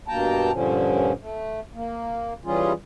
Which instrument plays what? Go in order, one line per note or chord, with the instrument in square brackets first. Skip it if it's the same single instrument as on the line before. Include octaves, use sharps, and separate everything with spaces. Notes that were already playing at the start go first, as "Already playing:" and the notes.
[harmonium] G2 B2 A#3 G5 A5 A#5
G2 A#2 D3 F3 C#4
A3
A#3
E3 G3 C#4 F4 G#4